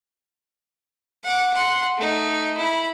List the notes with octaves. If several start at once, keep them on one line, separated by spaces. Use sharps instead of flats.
F#5 D6
F#5 C6
A3 D#4
E4 B5